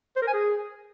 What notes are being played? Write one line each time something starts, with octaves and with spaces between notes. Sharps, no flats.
C5
A#4
G#5
G#4